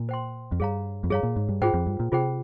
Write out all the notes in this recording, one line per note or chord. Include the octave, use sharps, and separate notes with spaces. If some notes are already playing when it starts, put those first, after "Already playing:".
Already playing: A#2
C5 G5 C6
F2
G2 G#4 C#5 F5 A#5
F2
G2 G#4 C#5 F5 A#5
A#2
G#2
G2
G#2 F4 G#4 C5 G5
F2
G2
A#2
C3 F4 G#4 C5 G5